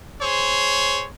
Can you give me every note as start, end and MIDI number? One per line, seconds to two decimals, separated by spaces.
0.21 1.06 68
0.21 1.06 72
0.21 1.06 73